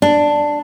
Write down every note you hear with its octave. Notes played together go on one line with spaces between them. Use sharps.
D4